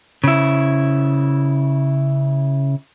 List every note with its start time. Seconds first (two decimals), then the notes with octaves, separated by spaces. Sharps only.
0.24 C#3 E4